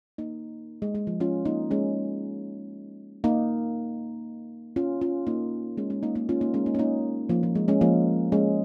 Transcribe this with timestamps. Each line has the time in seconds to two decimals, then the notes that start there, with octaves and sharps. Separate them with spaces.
0.18 A#3 D#4
0.82 G#3
0.95 G#3
1.07 F3
1.20 C#4 F4
1.45 A#3 D#4
1.71 G#3 C#4
3.24 A#3 D#4
4.76 C#4 F4
5.01 C#4 F4
5.27 A#3 D#4
5.77 G#3 C#4
5.90 G#3 C#4
6.03 A#3 D#4
6.16 A#3 D#4
6.29 C#4 F4
6.41 A#3 D#4
6.54 G#3 C#4
6.66 A#3 D#4
6.74 C#4
6.79 A#3 D#4
7.29 F3 A#3
7.43 F3
7.55 G#3
7.68 G#3 C#4
7.81 F3 A#3
8.32 G#3 C#4